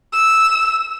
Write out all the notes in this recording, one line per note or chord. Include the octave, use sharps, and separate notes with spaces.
E6